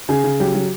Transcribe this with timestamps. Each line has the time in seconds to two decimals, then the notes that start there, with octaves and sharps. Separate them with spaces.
0.09 C#3 G#4
0.24 C#3
0.40 F#3 G4
0.55 F#3